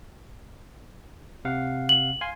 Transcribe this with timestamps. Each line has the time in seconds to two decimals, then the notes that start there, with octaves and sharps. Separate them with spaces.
1.45 C3 F5 F#5
1.89 F#7
2.21 F5 G#5 C6